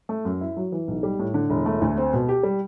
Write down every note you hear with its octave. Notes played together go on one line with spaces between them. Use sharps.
A3
F#2
E4
F#3
E3
B1
G3
A2
D3
E1
A3
D2
C4
B2
G4
G3